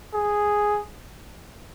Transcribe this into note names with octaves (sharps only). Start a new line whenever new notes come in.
G#4